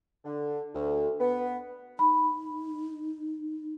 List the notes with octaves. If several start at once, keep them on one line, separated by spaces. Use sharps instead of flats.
D3
D2
B3
D#4 B5